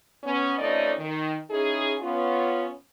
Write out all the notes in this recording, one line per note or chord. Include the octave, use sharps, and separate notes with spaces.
B3 C#4
F2 A3 C#4 D#4 D5 D#5
D#3
C#4 D#4 E4 G#4
B3 C#4 F4